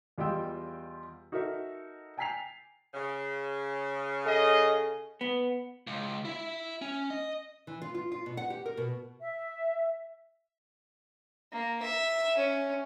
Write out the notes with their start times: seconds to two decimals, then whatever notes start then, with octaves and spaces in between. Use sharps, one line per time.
0.18 E2 G3 F4 D#5 G5 E6
1.32 D#4 F#4 A4 A#4 D#5 E5
2.18 G5 G#5 A#5 B6 C7 F7
2.94 C#3
4.25 A4 D#5 G#5
5.21 B3
5.87 C#2
6.25 E4 E5
6.82 C#4
7.10 D#5
7.67 E3
7.82 F4
7.94 F4
8.12 F4
8.26 B2
8.37 F#5
8.50 G4
8.66 A#4
8.77 B2
9.20 E5
11.52 A#3
11.83 E5
12.38 C#4